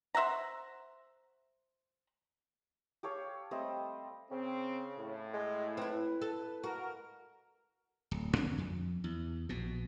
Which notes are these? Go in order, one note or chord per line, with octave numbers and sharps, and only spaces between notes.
C5 E5 F#5 A#5
G4 A4 C#5 F5
G3 A3 C4 D#5
C#3 C4
A2
G#3
C4 E4 B4
A4
F#4 A#4
D1
E2 D3 C4 D4
F2
E2
A#1 B2